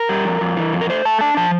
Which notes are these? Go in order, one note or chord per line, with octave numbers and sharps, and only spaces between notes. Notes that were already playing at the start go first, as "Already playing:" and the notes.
Already playing: A#4
G3
F2
F2
E3
F2
A#4
A3 C5
A3 A5
D4 A5
F3 A5